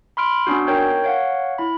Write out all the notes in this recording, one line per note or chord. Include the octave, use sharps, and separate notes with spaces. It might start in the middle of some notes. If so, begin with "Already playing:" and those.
B5 C6 F6 D7
B3 C#4 D4 F#4
D#4 A#4 C#5 G5 G6
C#5 F5 F#5
E4 B5